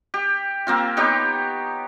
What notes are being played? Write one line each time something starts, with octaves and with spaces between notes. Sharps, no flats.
G4
A#3 C4 F4
B3 D#4 G4 C#5